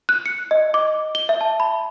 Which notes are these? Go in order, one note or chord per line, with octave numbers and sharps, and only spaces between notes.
F#6
C#7
D#5
D6
G7
E5
A5
B5